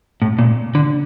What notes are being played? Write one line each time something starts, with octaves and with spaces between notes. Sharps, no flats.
A2
A#2
D3